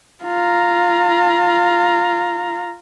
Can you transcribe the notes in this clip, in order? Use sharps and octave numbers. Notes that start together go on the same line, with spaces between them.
F4 A#5